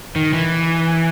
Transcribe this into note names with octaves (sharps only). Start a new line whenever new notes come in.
D#3
E3